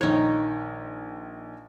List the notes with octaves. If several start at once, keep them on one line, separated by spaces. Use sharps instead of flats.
A#1 D#3 D#4 C#5 G#6